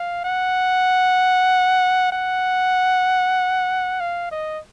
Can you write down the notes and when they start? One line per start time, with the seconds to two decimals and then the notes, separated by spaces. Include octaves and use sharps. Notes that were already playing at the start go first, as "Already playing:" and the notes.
Already playing: F5
0.24 F#5
2.12 F#5
4.00 F5
4.31 D#5